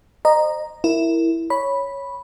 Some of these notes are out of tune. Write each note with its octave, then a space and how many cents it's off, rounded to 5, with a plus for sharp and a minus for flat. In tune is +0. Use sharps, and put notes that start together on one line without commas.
C5 +0 D#5 -25 A#5 +0
E4 +0 A#4 -10
C#5 +0 B5 -5